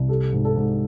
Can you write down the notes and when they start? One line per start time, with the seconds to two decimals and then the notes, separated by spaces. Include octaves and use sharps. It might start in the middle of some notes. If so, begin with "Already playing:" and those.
Already playing: C2
0.08 G3 A4
0.33 G#2
0.45 A4
0.56 G#2